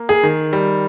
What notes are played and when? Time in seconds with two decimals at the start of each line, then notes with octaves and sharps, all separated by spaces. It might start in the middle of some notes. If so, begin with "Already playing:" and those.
Already playing: A#3
0.09 G#4
0.23 D#3
0.53 G3